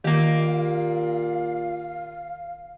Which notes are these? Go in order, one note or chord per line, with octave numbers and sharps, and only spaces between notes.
A#2 D#3 A#3 G4 F5